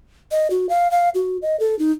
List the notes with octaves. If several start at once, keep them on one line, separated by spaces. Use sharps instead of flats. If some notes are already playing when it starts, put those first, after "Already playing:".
D#5
F#4
F5
F5
F#4
D#5
A4
D#4